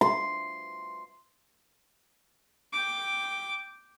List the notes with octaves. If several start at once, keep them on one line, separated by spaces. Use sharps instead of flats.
C6
G5 D6